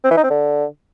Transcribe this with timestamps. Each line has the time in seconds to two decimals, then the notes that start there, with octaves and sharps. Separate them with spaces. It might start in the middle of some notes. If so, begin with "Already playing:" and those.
0.04 C4
0.11 E3
0.17 D#4
0.24 C4
0.30 D3